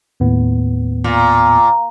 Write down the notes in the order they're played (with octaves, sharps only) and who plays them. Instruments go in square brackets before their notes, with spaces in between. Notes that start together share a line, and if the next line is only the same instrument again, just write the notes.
[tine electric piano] D#2 A2 B3
[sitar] A#2